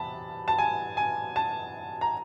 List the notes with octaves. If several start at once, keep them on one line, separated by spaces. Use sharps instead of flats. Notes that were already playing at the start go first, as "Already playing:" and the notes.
Already playing: E2 C3 A5 B5
A5
G#5
G#5
A5
A#5